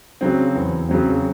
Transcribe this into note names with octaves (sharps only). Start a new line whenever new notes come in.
C#3 F#3 C4
E2
C#3 F#3 C4